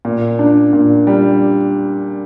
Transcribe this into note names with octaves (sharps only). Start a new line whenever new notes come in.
A#2
D4
A#2
G3